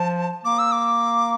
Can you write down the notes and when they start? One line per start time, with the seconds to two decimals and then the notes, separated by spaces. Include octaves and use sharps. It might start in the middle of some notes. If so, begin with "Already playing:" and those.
Already playing: F3 A5
0.45 A#3 D6
0.59 E6
0.72 D6